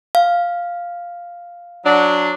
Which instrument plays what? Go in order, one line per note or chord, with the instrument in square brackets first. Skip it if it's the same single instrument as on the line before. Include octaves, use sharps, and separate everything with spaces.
[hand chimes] F5
[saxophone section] F#3 D4